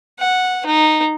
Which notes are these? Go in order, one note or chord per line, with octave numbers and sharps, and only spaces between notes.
F#5
D#4